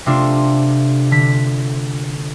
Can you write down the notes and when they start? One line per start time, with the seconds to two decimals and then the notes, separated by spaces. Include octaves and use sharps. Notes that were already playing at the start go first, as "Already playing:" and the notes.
0.06 C3 A3 D4 F4
1.11 D3 B6